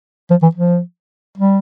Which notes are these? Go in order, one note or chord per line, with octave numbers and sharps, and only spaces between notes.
F3
E3
F3
G3